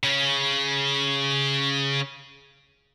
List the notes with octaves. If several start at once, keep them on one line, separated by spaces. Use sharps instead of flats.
C#3 C#4